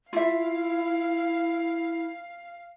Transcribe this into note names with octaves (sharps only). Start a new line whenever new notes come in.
E4 F4 E5 F5